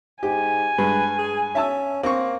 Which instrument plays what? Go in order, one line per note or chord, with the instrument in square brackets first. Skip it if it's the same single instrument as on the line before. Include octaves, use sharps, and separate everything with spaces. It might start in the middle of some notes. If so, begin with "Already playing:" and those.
[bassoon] G#2 [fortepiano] G4 [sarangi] G#5
[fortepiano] G2 G#3 [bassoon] B4
[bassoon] G#4
[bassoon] C#4 [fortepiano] E5 A5 E6
[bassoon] A#3 [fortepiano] C4 C#6